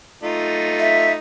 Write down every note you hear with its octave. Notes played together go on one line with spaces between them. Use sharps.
A3 D#4 F4
E5